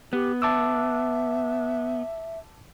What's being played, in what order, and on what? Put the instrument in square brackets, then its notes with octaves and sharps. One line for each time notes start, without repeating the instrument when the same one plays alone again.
[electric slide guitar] B3 [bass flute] G4
[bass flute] E5 [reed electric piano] A5 D6 E6